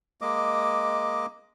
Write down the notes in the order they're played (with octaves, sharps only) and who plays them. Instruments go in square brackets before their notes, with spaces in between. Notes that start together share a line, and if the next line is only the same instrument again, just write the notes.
[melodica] G#3 A#3 D#5 D6